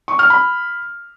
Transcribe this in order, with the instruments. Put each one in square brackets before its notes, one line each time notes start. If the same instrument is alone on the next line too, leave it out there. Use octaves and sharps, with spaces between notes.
[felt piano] C#6
F6
B5